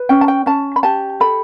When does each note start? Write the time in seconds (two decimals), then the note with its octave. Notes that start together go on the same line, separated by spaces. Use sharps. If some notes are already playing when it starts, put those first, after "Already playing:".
Already playing: B4
0.09 C#4 G5
0.21 A5
0.28 G5
0.46 C#4 A5
0.76 B5
0.83 G4 A5
1.20 A4 B5